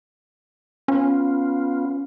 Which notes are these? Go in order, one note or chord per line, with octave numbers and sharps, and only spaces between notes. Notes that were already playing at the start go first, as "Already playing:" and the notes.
B3 C#4 F4